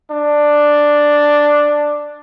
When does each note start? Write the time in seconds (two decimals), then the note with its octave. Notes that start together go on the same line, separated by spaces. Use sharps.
0.11 D4